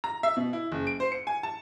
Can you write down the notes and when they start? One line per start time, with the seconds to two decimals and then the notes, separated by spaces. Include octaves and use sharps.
0.04 A#5
0.23 E5
0.37 B2
0.53 E4
0.72 F#1
0.87 D7
1.00 C5
1.12 C#7
1.27 G#5
1.43 A5